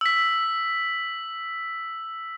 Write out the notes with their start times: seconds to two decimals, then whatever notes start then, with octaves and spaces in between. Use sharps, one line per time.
0.01 E6 B6